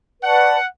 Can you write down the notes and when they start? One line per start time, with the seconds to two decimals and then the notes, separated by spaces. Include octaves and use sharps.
0.22 B4 D5 F#5 A5 C#6